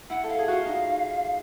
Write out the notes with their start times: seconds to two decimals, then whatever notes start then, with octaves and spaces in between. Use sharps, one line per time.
0.10 E4 F#5
0.24 A4 F5
0.39 G#4
0.47 F4 F#4 F5
0.66 D#4